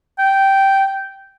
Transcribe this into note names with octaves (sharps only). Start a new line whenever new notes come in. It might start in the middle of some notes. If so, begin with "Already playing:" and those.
G5